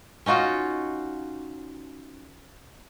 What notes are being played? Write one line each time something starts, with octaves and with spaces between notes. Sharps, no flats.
C#4 D#4 F4 F#4